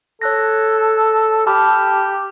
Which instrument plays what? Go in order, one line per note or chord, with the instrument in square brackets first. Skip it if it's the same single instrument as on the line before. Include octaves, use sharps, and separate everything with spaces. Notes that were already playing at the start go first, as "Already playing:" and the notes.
[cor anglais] A4 [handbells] C#5 F#6 A#6
[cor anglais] G4 [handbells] A5 B5 F6